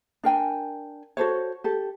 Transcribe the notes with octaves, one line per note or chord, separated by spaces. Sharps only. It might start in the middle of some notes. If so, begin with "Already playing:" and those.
D4 A#4 G5 G#5
F#4 A4 C5 C#5
G4 A4